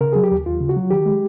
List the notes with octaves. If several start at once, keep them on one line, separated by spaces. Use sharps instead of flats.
C#3 A#4
F#3 G#4
G4
D#2
D#2 F4
C#3
F#4
F#3
D#3 G4
G#3